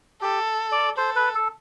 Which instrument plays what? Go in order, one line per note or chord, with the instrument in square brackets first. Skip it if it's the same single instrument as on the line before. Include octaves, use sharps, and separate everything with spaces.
[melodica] G4 [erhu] A4
[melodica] D5
[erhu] A4 [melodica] C5
[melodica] B4
A4